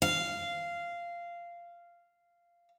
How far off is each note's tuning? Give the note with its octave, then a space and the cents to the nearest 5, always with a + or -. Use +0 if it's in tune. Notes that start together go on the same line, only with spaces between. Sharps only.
F5 -10